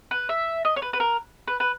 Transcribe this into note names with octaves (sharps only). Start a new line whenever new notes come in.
B4
E5
D#5
C#5
B4
B4
A#4
B4
B4